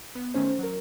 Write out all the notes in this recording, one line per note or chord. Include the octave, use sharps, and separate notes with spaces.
B3
D#3 A3 C#4 C5
F#3 A#4